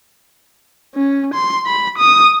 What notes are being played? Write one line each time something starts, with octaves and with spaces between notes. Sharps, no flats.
C#4
C6
B5
D#6